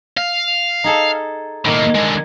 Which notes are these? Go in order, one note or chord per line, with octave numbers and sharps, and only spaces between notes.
F5
D#4 G#4 A4
A2 D#3 A#3
D3 G#3